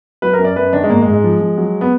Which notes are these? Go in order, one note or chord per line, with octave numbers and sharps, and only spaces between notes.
F#3 B4
A#4
F#2
D5
F#2 B4
D#3 D4
G#3
G#2 A#3
G#3
G#2
G#3
F3
F3
F#3
B3